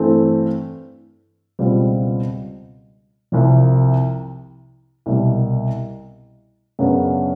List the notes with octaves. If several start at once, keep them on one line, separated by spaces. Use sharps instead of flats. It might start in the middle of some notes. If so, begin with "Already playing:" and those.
Already playing: G2 E3 A3 C4
C#2 B2 G3 C4 F4
C2 C3 F3
C2 B2 G3
F#2 C#3 F#3 B3 D4